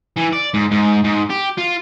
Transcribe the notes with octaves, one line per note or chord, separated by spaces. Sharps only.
E3
D5
G#2
G#2
G#2
G4
F4